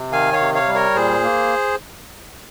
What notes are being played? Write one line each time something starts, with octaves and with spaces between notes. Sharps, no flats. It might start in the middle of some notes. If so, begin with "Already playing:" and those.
Already playing: C3
D#3 F5 G#5
C#5 F5
C3
C#5 F5
G3
A#4 C#5
A#2 G#4 C5
A#3